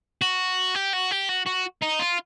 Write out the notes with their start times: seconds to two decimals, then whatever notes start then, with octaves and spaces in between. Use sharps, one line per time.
0.21 F#4
0.75 G4
0.93 F#4
1.11 G4
1.29 F#4
1.46 F#4
1.82 D#4
1.99 F4